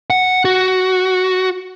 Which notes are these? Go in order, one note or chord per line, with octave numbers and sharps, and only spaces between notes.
F#5
F#4